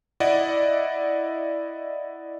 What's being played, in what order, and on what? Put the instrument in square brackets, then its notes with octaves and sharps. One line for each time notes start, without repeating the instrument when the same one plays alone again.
[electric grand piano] E4 D5 D#5 F#5